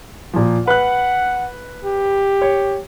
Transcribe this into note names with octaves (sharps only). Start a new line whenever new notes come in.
A#2 F3
B4 F#5 F#6
G4
C#5